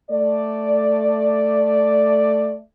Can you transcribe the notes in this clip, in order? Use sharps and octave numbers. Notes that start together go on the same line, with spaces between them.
A3 D5